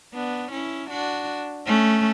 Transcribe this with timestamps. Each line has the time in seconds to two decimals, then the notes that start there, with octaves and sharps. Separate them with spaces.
0.13 B3 D4
0.52 C#4 E4
0.90 D4 F#4
1.66 A3 C#4